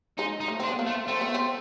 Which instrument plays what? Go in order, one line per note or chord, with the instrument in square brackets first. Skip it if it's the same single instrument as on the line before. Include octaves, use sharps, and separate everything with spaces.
[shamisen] G#3 [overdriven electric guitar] D#4
[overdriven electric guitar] D#4
[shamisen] A3
[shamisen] C4 [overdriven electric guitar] D4
[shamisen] B3
A#3
[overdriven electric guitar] A3
[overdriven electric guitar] A3 [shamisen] C4
[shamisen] B3
C4